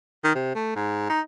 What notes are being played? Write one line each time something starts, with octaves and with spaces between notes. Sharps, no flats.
D#3
C3
A3
G#2
D#4